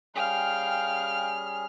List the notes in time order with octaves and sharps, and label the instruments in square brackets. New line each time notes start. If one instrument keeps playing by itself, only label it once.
[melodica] G3 C#4 G#4 [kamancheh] F5 G5 [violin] F6